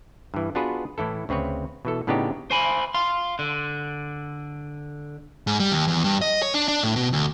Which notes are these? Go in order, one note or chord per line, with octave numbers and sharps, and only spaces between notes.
G2 E3
B3 D4 F4 F#4 G#4 B4
A2 E3 E4 A4
D2 C#3 C4 B4 C#5
B2 E3 A4
A2 C#3 B3 D4 D#4 G4
C5 G#5 B5
F5 C6
D3
G#2
G3
D#2
E2
G2
D#5
C#5
D4
D4
A2
B2
D2